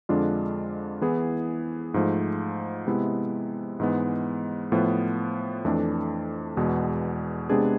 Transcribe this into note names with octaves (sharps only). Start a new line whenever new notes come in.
F2 D3 G#3 D4 F4
E3 B3 E4 G#4
G#2 F3 A3
C3 G#3 B3 E4
G#2 E3 G#3 B3
A2 F3 B3
F2 E3 A3 D4 A4
E2 B2 G#3 B3
C3 G#3 B3 D4 G#4